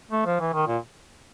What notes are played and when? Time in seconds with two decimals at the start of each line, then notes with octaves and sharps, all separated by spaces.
0.11 A3
0.26 F3
0.40 E3
0.54 D#3
0.68 A#2